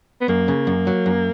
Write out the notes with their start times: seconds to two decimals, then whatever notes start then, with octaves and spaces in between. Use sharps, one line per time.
0.21 B3
0.28 F#2 A#3
0.48 C#3
0.67 F#2
0.87 F#3
1.06 F#2